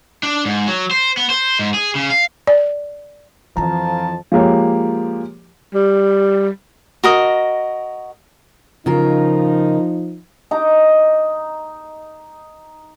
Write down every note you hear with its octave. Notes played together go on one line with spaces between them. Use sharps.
D4
G#2
F#3
C5
B3
C5
G#2
G#4
C#3
F5
D5
F2 E3 F3 E4 A5 A#5
F3 G#3 A#3 G4 C#5
G3
F#4 A#4 D#5
C#3 F3 D#4 F4 A#4
D#4 A#5 D6